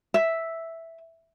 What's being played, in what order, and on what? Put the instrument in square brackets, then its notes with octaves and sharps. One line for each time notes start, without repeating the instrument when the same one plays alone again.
[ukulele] E5